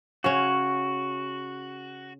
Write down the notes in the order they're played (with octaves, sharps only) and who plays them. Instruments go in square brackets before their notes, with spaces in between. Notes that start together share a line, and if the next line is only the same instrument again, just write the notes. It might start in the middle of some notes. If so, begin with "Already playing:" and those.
[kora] C#3 C#4 [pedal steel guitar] F#4